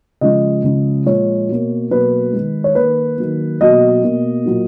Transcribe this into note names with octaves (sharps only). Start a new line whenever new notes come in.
C#3 F3 G#3 D#5
C#3 F3 G#3
A#2 F3 G#3 C#5
B2 A#3
B2 F#3 A#3 B4
D#3 G#3
C#5
D#3 A#3 B4
D#3 F#3 A#3
B2 F#3 A#3 D#5
B2 A#3
A#2 F#3 A#3